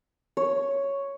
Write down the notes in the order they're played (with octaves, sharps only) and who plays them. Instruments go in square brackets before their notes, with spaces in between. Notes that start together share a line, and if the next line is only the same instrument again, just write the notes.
[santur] C#5